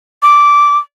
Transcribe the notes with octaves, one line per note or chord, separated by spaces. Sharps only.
D6